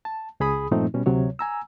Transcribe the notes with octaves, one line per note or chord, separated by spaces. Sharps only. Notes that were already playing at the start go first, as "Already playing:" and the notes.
A5
C#2 G#4 B5 D#6
G2 A#2 F3 A3 C4 D#4
B2 G3 C#4
D2 C3 F#3 C#5
G#5 A#5 E6